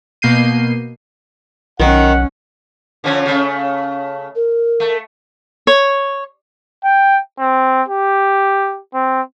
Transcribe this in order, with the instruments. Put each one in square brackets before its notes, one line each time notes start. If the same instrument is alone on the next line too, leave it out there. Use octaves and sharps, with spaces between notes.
[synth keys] B2 A#3 G6 C7 D#7
[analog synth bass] B1 [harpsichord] D#3 [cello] C#4 [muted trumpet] F#5
[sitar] D3 F3 C#4
C#3 A3
[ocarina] A#4
[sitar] A3
[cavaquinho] C#5
[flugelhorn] G5
C4
G4
C4